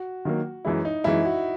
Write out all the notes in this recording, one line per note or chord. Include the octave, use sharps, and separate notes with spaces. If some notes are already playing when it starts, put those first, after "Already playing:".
Already playing: F#4
D#3 F#3 A#3
F#2 E3 G#3 E4
D#4
F#2 E3 G#3 E4
F#4